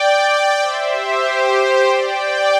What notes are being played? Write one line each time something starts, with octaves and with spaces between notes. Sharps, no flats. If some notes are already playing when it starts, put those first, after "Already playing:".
Already playing: D5 G5
C5 E5
G4 C5
G4 C5
G4
D5 G5